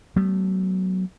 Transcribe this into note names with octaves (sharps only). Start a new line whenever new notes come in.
F#3 A3 B3